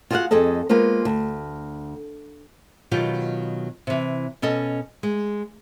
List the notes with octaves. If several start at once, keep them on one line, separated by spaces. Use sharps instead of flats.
F4 F#4 G#4 D#5 F5 F#5
F2 G#4 A4 D#5 A5
G#3 A#3 B3 F4 C5
D2
B2 D#3 F#3 B3 F4 G4
C3 E3
B2 C#4 A4 D#5
G#3